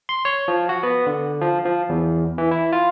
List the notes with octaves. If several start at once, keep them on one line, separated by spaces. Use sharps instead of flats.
C6
C#5
F3
F#4
B3
D3
F3
F3
E2
E3
E4
F4